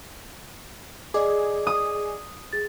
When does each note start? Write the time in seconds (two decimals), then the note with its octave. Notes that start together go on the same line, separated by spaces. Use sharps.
1.14 G#4 D5 D#5 D6
1.67 D#6
2.53 G#4 A6